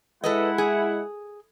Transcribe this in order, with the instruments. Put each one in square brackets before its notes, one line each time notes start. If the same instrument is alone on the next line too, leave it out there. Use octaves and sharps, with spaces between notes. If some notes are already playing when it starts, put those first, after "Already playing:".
[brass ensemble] G#3 E4 F#5 [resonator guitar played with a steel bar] A4 B4 D#5
[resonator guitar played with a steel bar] G#4